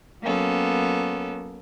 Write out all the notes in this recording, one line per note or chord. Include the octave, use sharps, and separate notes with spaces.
F#3 A#3 B3 C#4 A4